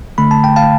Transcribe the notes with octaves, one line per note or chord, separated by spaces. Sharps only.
D3 A3 B5
A5
G5
F5 A5